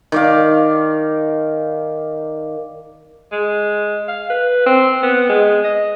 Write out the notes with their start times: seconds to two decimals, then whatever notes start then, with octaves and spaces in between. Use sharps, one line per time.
0.12 D#3 D5 F5
3.32 G#3
4.08 F5
4.30 B4
4.66 C4
5.03 B3
5.29 G#3
5.64 D#5